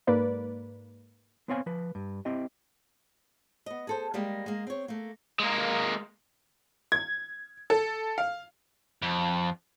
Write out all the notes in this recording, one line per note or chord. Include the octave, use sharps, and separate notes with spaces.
G#2 A#3 B4 D5
B3 C4 C5 C#5 F5 G#5
F3 B4
G2
C4 E4 G4 D#5
B3 D#5
G#4 A4 C5
G3 G#3 A#3 G4
G#3 A#3
C4 C#5
A3 A#3
G#3 A#3
G#6
A4
F5
F2